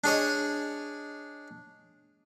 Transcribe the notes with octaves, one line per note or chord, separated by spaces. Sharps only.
D4 G#4 C#5 D#5